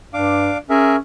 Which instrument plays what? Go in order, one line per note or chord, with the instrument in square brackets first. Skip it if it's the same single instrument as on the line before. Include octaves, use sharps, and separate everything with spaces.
[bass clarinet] G2 [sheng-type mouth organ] D4 F5 D6
[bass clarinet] C#4 [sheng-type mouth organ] G#4 A#4 E5